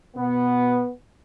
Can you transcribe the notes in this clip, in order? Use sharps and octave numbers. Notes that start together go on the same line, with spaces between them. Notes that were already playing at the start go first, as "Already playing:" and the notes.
B2 B3